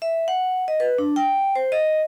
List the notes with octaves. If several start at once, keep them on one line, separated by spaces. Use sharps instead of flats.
E5
F#5
D#5
B4
D4
G5
C5
D#5